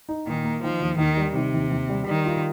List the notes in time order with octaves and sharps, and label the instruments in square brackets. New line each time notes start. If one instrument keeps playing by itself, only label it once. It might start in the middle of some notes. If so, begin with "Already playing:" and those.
[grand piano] D#4
[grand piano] A#2 [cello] D#3
[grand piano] A#3
[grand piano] D#3 [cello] F3
[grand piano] D#2
[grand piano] D#2 [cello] D#3
[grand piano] G3
[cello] C3 [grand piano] D#3
[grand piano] D#2
D#2
G3
[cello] D#3 [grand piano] G3
[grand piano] F4